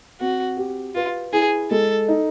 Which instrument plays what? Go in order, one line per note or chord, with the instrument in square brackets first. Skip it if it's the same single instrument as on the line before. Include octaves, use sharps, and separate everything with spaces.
[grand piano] C4 [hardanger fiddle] F#4
[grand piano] G4
[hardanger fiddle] F4 [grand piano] B4
[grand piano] E4 [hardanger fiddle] G#4
[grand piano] G#3 [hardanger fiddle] A4
[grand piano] D#4